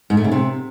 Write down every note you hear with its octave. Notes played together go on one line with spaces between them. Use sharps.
G#2
A3
C#3
C3